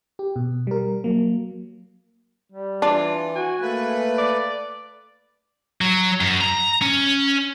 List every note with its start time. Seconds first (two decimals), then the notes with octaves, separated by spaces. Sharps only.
0.19 G4
0.36 B2
0.67 G3 A#4
1.04 F#3 A#3
2.52 G3
2.82 E3 D4 F4
3.36 F#4 G#5
3.62 A3 A#3 B4
4.18 D5
5.81 F#3
6.21 F#2
6.41 A#5
6.82 C#4